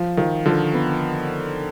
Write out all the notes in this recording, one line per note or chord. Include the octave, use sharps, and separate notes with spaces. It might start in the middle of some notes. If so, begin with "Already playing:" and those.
Already playing: F3
D#3 F3
D3 F3
B3